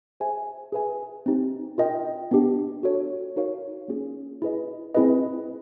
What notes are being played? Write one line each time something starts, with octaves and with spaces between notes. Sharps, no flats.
G#4 C5 E5 G#5
G#4 B4 E5 G#5
C4 D#4 G4
F4 A#4 D#5 G5
B3 D4 G4
F#4 A4 C#5
D#4 F#4 A#4 C#5 F5
A#3 C#4 F4 G#4 C#5
E4 G#4 B4 D#5
C4 E4 G#4 B4 D#5